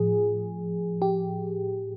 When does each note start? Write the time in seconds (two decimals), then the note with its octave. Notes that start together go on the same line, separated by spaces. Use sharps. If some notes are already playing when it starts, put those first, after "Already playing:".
Already playing: A2 F3 G#4
1.02 G4